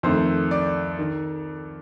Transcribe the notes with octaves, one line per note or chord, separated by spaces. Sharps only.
F2 D#3 A3 C5
D5
D#3